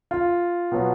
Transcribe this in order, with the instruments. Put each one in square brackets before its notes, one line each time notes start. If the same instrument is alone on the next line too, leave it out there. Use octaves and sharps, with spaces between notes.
[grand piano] F4
B2 F#3 B3